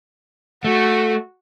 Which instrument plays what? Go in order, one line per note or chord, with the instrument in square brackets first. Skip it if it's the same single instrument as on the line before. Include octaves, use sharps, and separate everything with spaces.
[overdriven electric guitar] A3 [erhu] F#4